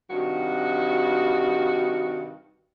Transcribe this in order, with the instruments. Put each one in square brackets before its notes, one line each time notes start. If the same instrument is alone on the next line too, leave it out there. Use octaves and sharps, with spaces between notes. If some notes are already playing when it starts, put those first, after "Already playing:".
[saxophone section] G2 C3 D#3 F#4